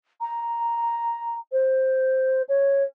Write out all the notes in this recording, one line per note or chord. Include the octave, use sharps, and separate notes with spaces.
A#5
C5
C#5